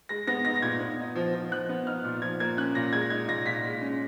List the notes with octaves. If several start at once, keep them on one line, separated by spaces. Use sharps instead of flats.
G#3 A#6
B3 A#6
D#4 A#6
A#6
A#2 G#6
B3
D#4
F3
F3
F3 F#6
B3
D#4 F6
A#2
F3 G#6
A#3 G#6
C#4 F#6
A#2 A#6
G#3 G#6
D#4 G#6
A#2 A#6
A#2 B6
G#3
C#4